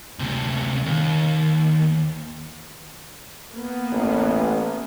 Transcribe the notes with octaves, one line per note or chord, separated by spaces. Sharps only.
D2 C3
D#2
A#3 B3
A1